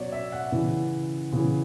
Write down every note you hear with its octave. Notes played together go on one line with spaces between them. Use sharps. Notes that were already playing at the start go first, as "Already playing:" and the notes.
Already playing: B2 F#3 C#5 D5
E5
F#5
C#3 E3
C#3 E3